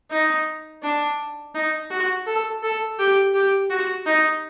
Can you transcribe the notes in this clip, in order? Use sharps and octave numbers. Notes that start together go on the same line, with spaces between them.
D#4
D4
D#4
F#4
A4
A4
G4
G4
F#4
D#4